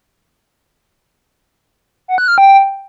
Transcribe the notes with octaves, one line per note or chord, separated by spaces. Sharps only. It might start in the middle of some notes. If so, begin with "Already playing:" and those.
F#5
F#6
F6
G5